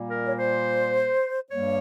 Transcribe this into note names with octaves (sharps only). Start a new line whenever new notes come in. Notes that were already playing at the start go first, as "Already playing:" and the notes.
Already playing: A#2 G3 A#3
A#4
C#5
C5
G2 G3 A#3 C#5